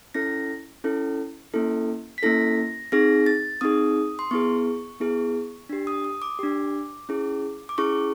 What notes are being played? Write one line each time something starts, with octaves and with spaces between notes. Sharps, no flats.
C#4 E4 A4 A#6
C#4 E4 A4
A#3 C#4 E4 A4
B6
A#3 C#4 E4 A4 A#6
C4 D#4 G#4 A#6
A6
C4 D#4 G#4 D#6
C6
B3 E4 G#4 C#6
B3 E4 G#4
D4 G4
D#6
D#6
D6
D4 G4
C#4 E4 G#4
D6
C#4 E4 G#4 C#6